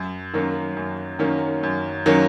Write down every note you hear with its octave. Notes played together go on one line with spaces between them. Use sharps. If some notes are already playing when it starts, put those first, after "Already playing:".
Already playing: F#2
D#3 F#3 A#3 C#4
F#2
D#3 F#3 A#3 C#4
F#2
D#3 F#3 A#3 C#4